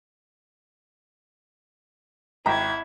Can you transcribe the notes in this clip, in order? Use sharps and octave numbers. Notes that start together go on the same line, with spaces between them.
G#1 E4 G5 A#5 G#6